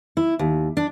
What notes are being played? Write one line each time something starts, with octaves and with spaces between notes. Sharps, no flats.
E4
D#2
D4